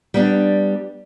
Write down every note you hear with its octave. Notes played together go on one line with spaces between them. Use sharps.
G3 B3 D4